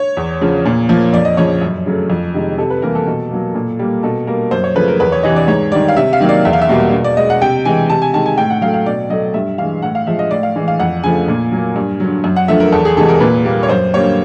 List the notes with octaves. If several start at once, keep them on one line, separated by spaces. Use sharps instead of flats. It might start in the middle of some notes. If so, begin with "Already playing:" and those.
Already playing: C#5
E2
C#3 F3
A#2
F3 A#3
F2 D5
D#5
C#3 F3 C#5
F#2
C#3 F#3 A3
F2
C3 D#3 G#3
C3 A4
B4
E3 G3 A#3 A#4
A4
B2
F#3 A#3
A#2
G3 A#3
B2 A4
G3 A#3 A#4
F#2 C5
C#5
C#3 F3 A3 B4
A#4
E2 B4
C#5
C3 E3 D#5
D5
G#2 C#5
D#3 G3 D5
F5
C3 E5
F5
D#3 F#3 A#3
D5
E2 E5
F5
E5
B2 G3 A#3
B2
D5
G#3 D#5
F#5
C3 G5
E3 G#3 G#5
C3 A5
G#5
D#3 G#3 A5
G#5
A2 G5
F#5
F#3 A3 F5
F5
B2 D5
F#3 A3 D#5
G2 E5
E3 G#3 F5
A2 F#5
F5
F3 G#3 E5
D#5
A2 D5
F5
E3 G#3
F5
F2 F#5
C#3 F3 A3 G#5
A#2
F#3 A#3
G2
D3 F#3
F#2
F#5
D3 F3 A3 E5
A#4
E2 A4
G#4
C3 E3 G#3 A4
A#4
A#2 B4
G3 A#3
C#5
F#2 C5
D3 G3 A#3 C#5